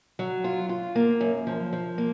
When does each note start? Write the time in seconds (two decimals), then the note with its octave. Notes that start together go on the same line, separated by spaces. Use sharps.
0.19 F#3
0.44 F4
0.69 F4
0.95 A#3
1.21 F#2
1.47 F3
1.73 F3
1.98 A#3